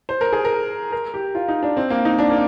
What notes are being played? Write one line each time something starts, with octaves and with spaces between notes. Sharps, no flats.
C5
A#4
G#4
A#4
A#4
G4
F4
D#4
D4
C4
A#3
D#4
D4
A#3